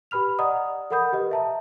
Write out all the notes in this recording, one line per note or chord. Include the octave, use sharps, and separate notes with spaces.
G4 B4 B5 F6 F7
D5 D#5 F#5 A#5 D#6
A4 A#4 F#5 B5 D#6 G6
G4 B4 D#5
E5 A5 A#5